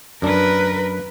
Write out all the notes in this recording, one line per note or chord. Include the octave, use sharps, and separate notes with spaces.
F#2 D4 A#4 B4